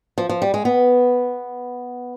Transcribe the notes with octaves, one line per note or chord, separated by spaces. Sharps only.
F3
F3
G3
G#3
B3